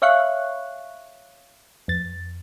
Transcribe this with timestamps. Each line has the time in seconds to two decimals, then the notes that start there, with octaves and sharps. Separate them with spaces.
0.02 C#5 E5 F5 C#6 F#6
1.88 F2 A6